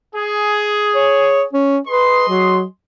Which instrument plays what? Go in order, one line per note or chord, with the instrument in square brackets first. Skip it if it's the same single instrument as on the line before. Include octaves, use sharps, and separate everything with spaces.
[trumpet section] G#4
[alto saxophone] C#5
C#4
[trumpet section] G#4 D#5 C6 [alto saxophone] B4
[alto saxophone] F#3